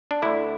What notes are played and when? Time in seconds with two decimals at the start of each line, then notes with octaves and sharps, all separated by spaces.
0.11 D4
0.22 D2 D3 E4